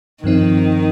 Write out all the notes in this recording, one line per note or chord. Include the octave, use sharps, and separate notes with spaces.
G2 D#3 F3 C4 D#4